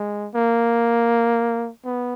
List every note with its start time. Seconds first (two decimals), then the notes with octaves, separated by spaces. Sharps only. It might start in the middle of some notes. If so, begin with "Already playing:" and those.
Already playing: G#3
0.35 A#3
1.85 B3